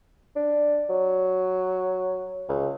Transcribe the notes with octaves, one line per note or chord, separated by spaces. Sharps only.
D4
F#3
C#2